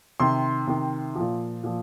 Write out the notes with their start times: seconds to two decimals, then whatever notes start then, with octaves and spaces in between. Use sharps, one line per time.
0.20 C3 D#3 C6
0.67 C3 D#3
1.15 A#2 F3
1.64 A#2 F3